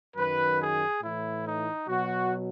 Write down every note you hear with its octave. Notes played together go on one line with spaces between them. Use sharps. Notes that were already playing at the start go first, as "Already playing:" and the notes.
F#2 D#3 F#3 B4
G#4
A2 E3 E4
D#4
B2 F#3 F#4